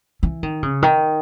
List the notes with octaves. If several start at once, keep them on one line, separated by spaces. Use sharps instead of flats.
E3
D#3
C#3
D#3